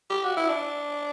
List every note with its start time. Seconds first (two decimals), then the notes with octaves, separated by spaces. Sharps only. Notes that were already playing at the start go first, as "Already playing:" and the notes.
0.11 G4
0.24 F#4
0.37 E4
0.50 D4